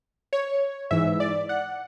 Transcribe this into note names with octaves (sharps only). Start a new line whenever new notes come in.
C#5
G#2 E3 E5
D5
F#5